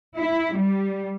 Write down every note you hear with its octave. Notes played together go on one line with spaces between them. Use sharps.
E4
G3